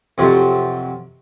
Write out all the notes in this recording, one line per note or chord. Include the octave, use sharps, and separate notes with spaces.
F2 C3 F#3